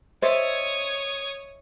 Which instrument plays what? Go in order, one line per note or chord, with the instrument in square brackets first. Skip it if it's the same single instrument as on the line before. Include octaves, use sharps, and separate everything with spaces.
[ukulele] C5 [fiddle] C#5 D#6 [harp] D#5 E5 A6 [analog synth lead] G#6